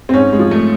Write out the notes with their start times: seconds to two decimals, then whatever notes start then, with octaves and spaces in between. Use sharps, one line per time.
0.09 C4
0.13 G#2 C#4
0.33 G#3
0.39 F3
0.51 A3